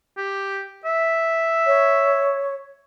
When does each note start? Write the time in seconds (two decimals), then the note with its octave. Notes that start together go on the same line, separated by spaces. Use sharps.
0.17 G4
0.85 E5
1.66 C#5